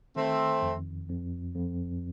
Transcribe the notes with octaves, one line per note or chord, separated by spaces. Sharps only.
D#3 A3 C4
F2
F2
F2